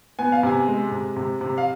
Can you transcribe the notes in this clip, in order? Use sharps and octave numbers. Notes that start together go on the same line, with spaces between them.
B3 G#5
F5
C3 G#5
G#3
C3
C3
C3
F5